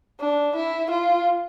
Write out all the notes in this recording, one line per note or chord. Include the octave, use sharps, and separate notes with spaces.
D4
E4
F4